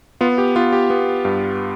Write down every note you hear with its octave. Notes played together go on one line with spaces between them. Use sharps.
B3 F4
G4
B3 F4
G4
B3
G2